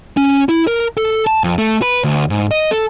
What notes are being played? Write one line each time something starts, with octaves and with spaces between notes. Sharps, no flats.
C#4
E4
A#4
A4
A5
F2
A3
B4
D2
G#2
D#5
A4